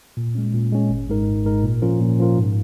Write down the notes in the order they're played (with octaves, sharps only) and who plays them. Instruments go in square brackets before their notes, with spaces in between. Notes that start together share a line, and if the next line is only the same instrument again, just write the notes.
[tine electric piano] A#2
G#3 C#4
A#2
G#3 C#4
G#1
G#2 G#3 D#4 A#4
G#1
G#2 G#3 D#4 A#4
A#2
F3 C#4 F4 A#4
A#2
F3 C#4 F4 A#4
G#2